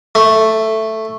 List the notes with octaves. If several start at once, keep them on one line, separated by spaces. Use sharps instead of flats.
A3